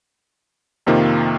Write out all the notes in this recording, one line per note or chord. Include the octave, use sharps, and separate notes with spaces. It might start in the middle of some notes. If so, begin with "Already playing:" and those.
F2 C3 D#3 A#3 F4